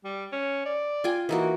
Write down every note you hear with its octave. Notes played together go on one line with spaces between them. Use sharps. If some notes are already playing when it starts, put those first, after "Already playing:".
G3
C#4
D5
F4 G5 G#5
E3 A#3 D#4 F#4